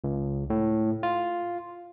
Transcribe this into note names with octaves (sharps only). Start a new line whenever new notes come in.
C#2
A2
F4